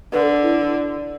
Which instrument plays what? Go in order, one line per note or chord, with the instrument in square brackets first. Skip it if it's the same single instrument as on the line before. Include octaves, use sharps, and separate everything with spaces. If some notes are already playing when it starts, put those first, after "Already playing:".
[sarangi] D3 [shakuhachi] B4
[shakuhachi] A4
E4